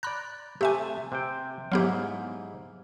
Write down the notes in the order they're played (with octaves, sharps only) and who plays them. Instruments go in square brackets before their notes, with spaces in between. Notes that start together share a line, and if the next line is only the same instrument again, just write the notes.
[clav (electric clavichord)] D5 A#5 [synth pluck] B5 F#6
[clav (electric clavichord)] C3 A3 [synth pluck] G4 E5 G#5
[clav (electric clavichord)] C3 C5 G5
[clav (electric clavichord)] G#2 E4 F5 [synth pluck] F#3 B3 G4